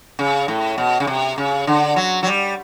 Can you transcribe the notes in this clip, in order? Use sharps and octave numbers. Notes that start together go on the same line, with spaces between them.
C#3
A2
B2
C#3
C3
C#3
D3
F#3
F#3
G3